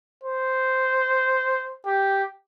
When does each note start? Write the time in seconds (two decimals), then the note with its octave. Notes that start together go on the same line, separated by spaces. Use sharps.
0.24 C5
1.86 G4